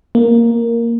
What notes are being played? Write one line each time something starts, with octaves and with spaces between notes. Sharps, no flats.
A#3